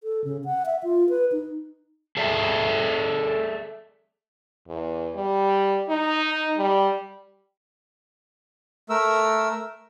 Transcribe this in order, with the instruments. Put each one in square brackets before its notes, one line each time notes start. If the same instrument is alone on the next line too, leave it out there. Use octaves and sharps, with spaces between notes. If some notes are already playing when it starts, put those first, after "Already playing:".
[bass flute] A4
C#3
F#5
E5
F4
B4
D#4
[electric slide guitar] G#4 A4 D5 E5 A5
[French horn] E2
G3
D#4
G3
[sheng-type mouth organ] A3 A#4 E6